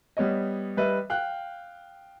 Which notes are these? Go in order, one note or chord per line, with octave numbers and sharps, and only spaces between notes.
G3 B3 C#5 D#5
G3 B4 D#5 E5
F5 G5 F#6